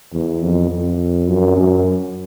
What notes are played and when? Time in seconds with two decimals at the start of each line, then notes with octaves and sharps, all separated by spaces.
0.13 E2
0.42 F2
0.70 F2
1.28 F#2
1.57 F#2